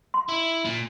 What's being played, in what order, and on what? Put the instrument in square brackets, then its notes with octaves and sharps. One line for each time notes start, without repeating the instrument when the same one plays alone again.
[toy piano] C6
[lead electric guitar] E4
A#2